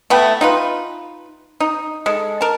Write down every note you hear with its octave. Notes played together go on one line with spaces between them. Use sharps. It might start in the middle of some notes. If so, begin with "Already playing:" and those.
A3 B3 E4 G5
D#4 F4 B4
D#4
G#3 A4
A#4 A5